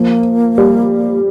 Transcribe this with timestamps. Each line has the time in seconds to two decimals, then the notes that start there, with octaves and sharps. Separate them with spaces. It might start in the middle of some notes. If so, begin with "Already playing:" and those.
Already playing: F3 A#3
0.58 G3